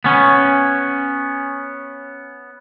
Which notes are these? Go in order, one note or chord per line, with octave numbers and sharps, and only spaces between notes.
B3 C#4